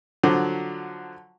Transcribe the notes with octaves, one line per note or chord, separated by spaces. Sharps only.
D3 F3 F#3